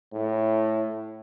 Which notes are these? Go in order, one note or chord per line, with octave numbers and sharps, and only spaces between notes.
A2